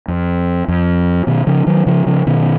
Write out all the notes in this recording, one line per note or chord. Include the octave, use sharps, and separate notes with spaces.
F2
F2
B2 D#3
C#3 F3
D#3 F#3
C#3 F3
C#3 F3
B2 D#3